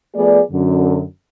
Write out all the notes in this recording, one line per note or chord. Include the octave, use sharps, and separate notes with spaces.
F3 A3 B3 G#4 D5
F#2 D3